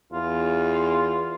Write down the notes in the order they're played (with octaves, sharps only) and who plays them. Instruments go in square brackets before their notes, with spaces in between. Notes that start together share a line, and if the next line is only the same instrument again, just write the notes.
[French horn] E2 [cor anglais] F4